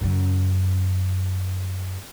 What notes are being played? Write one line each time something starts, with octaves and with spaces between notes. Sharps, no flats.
F#2 C#3